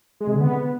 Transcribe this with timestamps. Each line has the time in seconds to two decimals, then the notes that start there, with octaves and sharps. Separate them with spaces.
0.20 G#3
0.27 C3
0.33 D3
0.40 B3